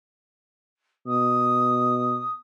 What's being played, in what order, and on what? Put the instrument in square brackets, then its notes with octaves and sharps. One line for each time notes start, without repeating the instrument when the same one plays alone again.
[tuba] B2 [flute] D#6